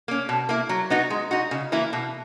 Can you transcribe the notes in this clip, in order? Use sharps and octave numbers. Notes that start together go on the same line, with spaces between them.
A#3 C#4
B2
A#3 E4
F#3
B3 D#4 F#4
G#3
D#4 F#4
C#3
E3 A#3 E4
B2